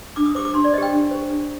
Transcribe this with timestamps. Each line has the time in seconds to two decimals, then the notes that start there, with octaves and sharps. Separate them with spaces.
0.16 D4 D6
0.26 D#6
0.35 G4 C5 D6
0.45 D6
0.54 D4 C6
0.64 D5
0.73 C5 D#5
0.78 G4 G5
0.92 D4
1.11 G4 C5
1.30 D4